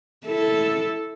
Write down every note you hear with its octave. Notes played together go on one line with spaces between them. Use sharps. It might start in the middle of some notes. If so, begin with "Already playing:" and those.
E4 A4